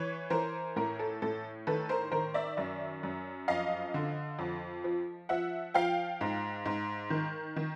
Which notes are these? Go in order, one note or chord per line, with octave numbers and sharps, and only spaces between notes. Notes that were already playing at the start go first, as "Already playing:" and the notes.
Already playing: E3 B4 C#5
E3 A#4 C5
A2 A#4
A4
A2 A4
D#3 A4 B4
A#4 C5
D#3 A#4 C5
D5 E5
F#2 D5 E5
F#2
F2 D#5 F5
D3
F2
F3
F3 E5 F#5
F3 F5 G5
G#2
G#2
D#3
D#3